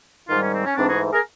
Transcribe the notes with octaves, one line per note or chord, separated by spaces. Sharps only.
G#2 D#3 G3 D#4 F4
C#4
C4
C#4
G#2 E3 A3 C4 D4
F#4 G#4
G#4 A#4